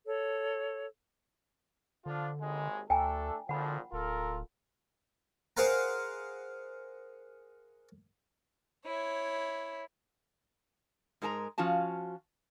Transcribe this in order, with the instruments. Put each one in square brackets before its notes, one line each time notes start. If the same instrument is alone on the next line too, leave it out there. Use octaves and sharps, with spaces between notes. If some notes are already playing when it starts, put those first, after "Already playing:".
[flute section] A4 C#5
[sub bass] D3 [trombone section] F3 D4 F4
[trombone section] G#1 D#2 G#3
[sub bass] D2 [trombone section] A3 D4 A4 [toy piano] G5 G#5 A#5
[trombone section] G#1 A#2 F3 [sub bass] D3 [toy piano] F#5 B5
[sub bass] D1 [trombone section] F4 A4 A#4
[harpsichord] G#4 A#4 C5 F5 F#5 A#5
[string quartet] E4 C#5
[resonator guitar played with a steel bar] G#2 G#3 A#4 A5 A#5
F3 C#4 F4 F#4 A5